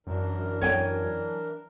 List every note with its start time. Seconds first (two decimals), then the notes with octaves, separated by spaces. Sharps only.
0.07 F#2 E3 D4 A#4
0.61 F#3 C#5 G5 G#5